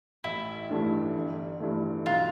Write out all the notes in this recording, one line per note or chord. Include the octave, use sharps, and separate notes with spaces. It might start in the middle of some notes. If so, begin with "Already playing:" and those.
A1 E4
G2 E3 A3 D4
G1
G2 E3 A3
B1 F4